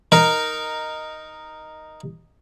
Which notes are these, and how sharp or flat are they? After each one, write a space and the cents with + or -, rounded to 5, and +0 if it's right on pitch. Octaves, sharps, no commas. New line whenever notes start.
D#4 +0 A#4 +0